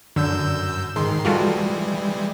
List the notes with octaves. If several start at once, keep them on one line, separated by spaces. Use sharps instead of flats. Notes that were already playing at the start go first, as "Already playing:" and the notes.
F#2 D3 E6 G6
G#2 D#3 G#3 C6
E3 G3 G#3 F4 F#4 A4